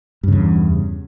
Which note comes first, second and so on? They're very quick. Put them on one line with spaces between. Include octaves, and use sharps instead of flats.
G2 C#3 E2